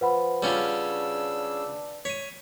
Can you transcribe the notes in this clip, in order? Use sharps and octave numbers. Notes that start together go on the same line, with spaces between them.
F3 B4 F#5 B5
C#3 G3 C#4 D4 F4 E6
C#5 B6 D#7